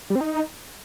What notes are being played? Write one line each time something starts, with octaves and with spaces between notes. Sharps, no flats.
G3
C4
D#4